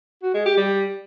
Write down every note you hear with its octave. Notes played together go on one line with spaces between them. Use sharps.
F#4
G#3
G4
G3